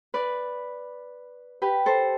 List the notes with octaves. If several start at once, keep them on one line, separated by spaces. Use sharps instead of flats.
B4 D5
G4 B4
A4 C5